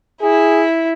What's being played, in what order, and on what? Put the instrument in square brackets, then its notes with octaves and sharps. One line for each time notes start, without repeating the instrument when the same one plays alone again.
[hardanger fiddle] E4 [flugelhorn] G#4